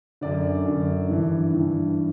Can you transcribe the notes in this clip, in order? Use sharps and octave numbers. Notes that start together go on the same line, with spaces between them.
F#2 D3 D5
F#2 D3
G2 E3
G2 E3